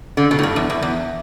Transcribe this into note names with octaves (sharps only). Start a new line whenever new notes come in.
D3
B2
A2
G2
E2
E2
E2